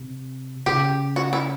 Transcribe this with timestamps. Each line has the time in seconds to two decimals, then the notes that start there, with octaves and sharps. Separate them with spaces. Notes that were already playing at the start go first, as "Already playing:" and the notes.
Already playing: C3
0.66 C#3 G4
1.16 F#4
1.33 E4